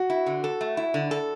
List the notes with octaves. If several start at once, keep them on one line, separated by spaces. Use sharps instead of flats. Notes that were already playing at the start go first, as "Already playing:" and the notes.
Already playing: F#4
E4
D3
A4
A3
E4
D3
A4